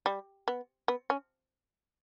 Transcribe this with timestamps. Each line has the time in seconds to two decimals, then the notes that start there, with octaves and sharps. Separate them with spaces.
0.06 G3
0.48 B3
0.88 B3
1.10 C#4